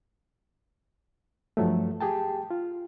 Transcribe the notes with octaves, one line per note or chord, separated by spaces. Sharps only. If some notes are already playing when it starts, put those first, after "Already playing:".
G2 F3 F#3 A3
G4 G#4 G5 A5
F4